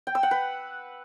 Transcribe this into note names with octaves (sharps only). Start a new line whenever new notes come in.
G5
E6
F#5
B4